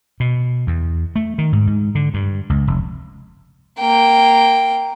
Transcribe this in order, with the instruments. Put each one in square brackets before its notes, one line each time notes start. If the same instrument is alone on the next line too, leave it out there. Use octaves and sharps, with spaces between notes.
[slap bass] B2
E2
A3
D#3
G#2
G#2
D3
G2
C#2
F1
[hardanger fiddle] A#3 G5